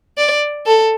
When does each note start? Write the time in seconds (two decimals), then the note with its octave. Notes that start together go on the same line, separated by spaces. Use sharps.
0.18 D5
0.67 A4